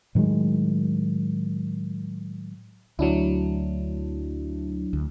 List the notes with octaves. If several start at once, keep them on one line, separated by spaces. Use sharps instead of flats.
A2 D#3 F#3 G#3
D2 F#3 D4 E4
D2